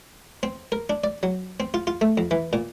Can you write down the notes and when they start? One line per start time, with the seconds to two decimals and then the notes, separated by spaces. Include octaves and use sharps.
0.43 C4
0.72 A#4
0.90 D4
1.04 D5
1.23 F#3
1.60 C4
1.74 F4
1.87 F4
2.01 A3
2.18 F2
2.31 E3
2.53 A#2